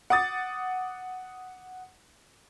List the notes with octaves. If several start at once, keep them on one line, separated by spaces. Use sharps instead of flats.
F#5 D6 D#6 A6